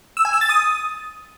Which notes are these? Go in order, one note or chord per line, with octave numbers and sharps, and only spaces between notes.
E6
G#5
E6
A6
D#6